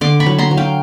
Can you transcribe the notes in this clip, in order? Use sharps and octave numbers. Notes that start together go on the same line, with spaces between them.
D3 C6 D6
B5 C#6
F#3
A#5 C6
F#3
F5 G5